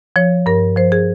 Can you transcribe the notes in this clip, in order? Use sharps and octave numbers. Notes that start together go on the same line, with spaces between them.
F3 C#5
G2 A#4
F3 C5
G#4